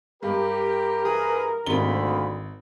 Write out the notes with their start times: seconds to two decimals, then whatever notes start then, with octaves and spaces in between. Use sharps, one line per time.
0.23 G2 G4 A#4
1.05 E3 G#4 B4
1.66 G#1 D2 C3 A#3 B5 G7